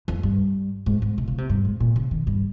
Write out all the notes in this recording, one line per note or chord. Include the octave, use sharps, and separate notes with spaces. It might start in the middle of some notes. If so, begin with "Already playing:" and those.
F2
G2
G#2
G#2
C3
C#3
C3
G2
G#2
A#2
C#3
D#3
G2